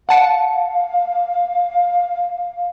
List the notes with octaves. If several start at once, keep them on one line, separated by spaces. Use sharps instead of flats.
F5 F#5 A5 C#7